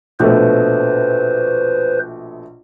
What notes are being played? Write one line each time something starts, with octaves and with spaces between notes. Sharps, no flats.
A#1 B2 A3 B4 C5